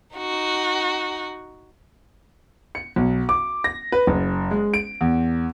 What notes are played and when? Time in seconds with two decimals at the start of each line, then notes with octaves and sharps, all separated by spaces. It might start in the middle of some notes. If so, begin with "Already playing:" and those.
0.17 D#4 F#4
2.75 C#7
2.96 B1
3.29 D6
3.64 A#6
3.92 B4
4.07 F#1
4.51 G#3
4.74 D7
5.01 E2